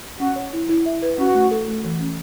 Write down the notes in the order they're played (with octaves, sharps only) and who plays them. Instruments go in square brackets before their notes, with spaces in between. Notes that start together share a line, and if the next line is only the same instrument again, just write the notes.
[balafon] C#4 [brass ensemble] F#4
[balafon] C#5
E4
E4
E5
B4
[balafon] C#4 [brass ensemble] F#4
[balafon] A3
A4
A3
E3
C#4